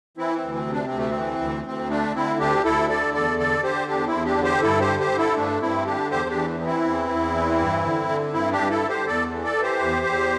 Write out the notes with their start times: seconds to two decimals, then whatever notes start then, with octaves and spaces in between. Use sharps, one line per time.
0.17 E3 C4 E4
0.36 C4
0.42 D2
0.54 C4
0.67 C3
0.73 D4
0.86 C4
0.92 D2
0.98 A3
1.10 C4
1.16 E3
1.41 D2
1.66 D2 C4
1.90 D3 A3 D4
2.15 D3 C4 E4
2.40 D2 D4 G4
2.64 D2 E4 A4
2.89 D3 A4 D5
3.14 E2 A4 D5
3.38 D3 A4 D5
3.63 D3 G4 C5
3.88 E2 D4 G4
4.06 C4 E4
4.13 E2
4.25 D4 G4
4.38 D3
4.44 G4 C5
4.62 G2 E4 A4
4.81 G4 C5
4.87 D3
5.00 G4 C5
5.12 D3
5.18 E4 A4
5.36 G2 A3 D4
5.61 G2 C4 E4
5.86 D3 D4 G4
6.11 E2 G4 C5
6.29 D4 G4
6.35 E3
6.60 E3
6.66 C4 E4
6.85 E2
7.10 E2
7.35 E3
7.59 G2
7.84 D3
8.08 D3
8.33 G2 C4 E4
8.52 D4 G4
8.58 G2
8.70 E4 A4
8.82 D3
8.89 G4 C5
9.07 E2 A4 D5
9.32 E3
9.44 A4 D5
9.57 E3
9.63 G4 C5
9.81 E2
10.06 E2